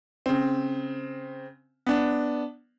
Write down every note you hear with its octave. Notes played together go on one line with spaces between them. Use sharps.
C#3 C4
B3 D4